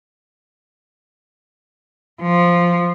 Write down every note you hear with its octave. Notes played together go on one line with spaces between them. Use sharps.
F3